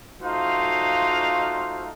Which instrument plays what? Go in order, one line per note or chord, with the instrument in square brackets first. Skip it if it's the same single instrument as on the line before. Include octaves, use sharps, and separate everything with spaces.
[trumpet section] A3 D#4 F4 F#4 C5 F5